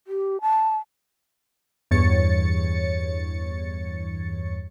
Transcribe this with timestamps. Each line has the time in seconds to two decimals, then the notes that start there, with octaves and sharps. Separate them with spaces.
0.07 G4
0.41 A5
1.91 E2 G2 C#5 A6 C#7